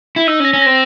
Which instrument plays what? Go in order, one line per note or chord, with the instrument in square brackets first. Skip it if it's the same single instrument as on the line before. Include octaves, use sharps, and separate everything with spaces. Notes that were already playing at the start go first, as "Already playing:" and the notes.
[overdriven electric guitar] E4
[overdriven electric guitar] D#4 [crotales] E6
[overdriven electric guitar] C#4
[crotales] A#6
[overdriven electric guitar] C#4
[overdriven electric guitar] C4 [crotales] A#6